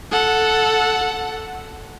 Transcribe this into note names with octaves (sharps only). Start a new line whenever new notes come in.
A4 F#5